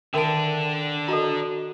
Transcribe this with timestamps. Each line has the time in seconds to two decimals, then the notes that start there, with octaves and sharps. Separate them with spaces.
0.14 D3 D#3 D4 A#4 E5 G5 A5 D7
1.08 F#4 A4 D#5 A#5